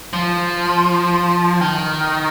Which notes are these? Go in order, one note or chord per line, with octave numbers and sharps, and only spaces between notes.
F3
D#3